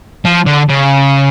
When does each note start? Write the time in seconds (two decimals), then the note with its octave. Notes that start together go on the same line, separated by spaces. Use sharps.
0.25 F3
0.46 D3
0.70 C#3